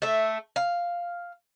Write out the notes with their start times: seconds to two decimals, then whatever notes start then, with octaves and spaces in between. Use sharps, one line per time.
0.02 A3 E5
0.56 F5